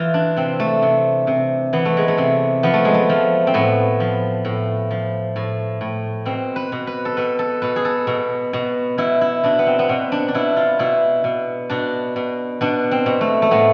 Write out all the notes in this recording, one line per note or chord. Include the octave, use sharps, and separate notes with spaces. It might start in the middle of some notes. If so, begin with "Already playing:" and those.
Already playing: E3 F4 A4
D4
C3 C4
A3
C3
C3
E3 B3
A3
G#3
A3
C3
F3 B3
A3
G#3
A3
F3
C4
A2 B3
F3
A2
F3
A2
A2
B2 C4
B4
B2
B4
A4
B2 B4
A4
B2 B4
G#4
A4
B2
B2
B2 E4
E4
B2 D4
B3
C4
B3
B2 C4
D4
D4
B2 E4
F4
B2 E4
B2
B2 D4
B2
B2 D4
C4
B2
A3
A3
A2 B3